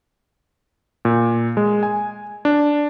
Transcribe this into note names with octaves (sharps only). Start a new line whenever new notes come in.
A#2
G#3
G#5
D4